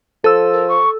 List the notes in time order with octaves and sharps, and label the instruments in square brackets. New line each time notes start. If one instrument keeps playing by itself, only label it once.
[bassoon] F3 [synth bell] A4 E6
[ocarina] A#4
C#6